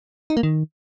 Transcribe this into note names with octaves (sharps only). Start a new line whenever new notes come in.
D#4
A#3
D#3